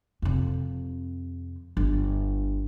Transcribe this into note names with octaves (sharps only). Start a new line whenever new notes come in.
F2 C3
G1